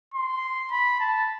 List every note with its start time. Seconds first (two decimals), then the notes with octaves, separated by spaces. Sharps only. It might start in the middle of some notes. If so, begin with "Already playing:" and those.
0.14 C6
0.71 B5
1.00 A5